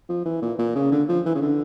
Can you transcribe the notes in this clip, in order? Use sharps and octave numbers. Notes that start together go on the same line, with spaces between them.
F3
E3
A#2
A#2
C#3
D3
F3
E3
C#3
D3